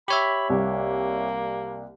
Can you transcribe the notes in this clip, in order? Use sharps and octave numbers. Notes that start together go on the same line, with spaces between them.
G4 C#5 E5 B5
C2 A#3